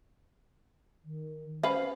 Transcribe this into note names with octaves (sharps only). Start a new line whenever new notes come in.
D#3
C#4 B4 C5 F5